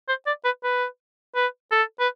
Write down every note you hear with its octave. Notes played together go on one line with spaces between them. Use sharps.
C5
D5
B4
B4
B4
A4
B4